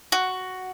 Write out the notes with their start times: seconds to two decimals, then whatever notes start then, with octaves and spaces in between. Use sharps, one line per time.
0.12 F#4